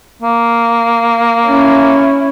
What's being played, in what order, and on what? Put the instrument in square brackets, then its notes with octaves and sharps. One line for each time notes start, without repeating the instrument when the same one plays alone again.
[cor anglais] A#3
[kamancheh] C#4 E4